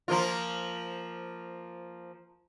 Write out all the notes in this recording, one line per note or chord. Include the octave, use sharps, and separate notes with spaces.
F3 A#3 F4